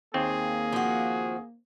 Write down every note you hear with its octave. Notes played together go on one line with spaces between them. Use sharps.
D#2 A#3 C4 G#4
F3 F#4